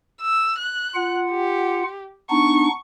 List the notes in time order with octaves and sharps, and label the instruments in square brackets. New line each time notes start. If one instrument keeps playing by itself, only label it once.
[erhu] E6
F#6
[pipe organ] F4 F#5
[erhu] G4
[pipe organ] B3 D4 D#4 [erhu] C#6